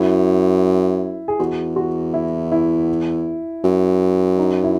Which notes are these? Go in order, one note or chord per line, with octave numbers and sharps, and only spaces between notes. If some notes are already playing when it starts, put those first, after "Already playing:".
Already playing: F#2 E4
G#4
E2 F#4
F#4
E4
E4
F#2
D#4
E4